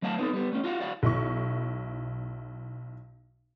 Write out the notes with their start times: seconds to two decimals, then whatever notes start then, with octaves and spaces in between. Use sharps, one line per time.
0.02 F#3 A3 F5 F#5 A5
0.18 B3 C4 D#4 A4
0.33 G3 B3
0.53 A3 C#4
0.64 F4 F#4 F5 F#5
0.81 F#4 D5 F5 F#5
1.03 B1 E4 C#6